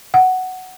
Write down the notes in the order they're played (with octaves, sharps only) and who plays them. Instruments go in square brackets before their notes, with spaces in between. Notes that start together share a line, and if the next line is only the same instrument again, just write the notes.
[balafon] F#5